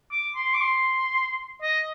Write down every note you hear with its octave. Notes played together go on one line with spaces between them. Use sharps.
D6
C6
D6
C6
D#5